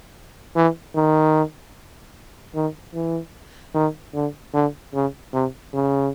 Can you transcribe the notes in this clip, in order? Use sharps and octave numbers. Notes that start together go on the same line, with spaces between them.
E3
D#3
D#3
E3
D#3
D3
D3
C#3
C3
C#3